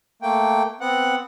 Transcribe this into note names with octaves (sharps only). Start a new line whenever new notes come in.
A3 A#3 G5
B3 C4 F#5